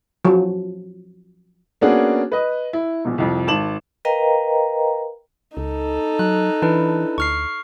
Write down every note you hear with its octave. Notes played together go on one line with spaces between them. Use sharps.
F3 F#3
A#3 B3 C#4 D4 F#4 G#4
B4 D#5
E4
A#1 B2
C2 F2
G#1 A5 E7 F#7
A#4 B4 D#5 F5 G5 A#5
C#2 D#4 A4
F#3 F#6
E3 D4 E4 B4
D2 C#6 F6 C7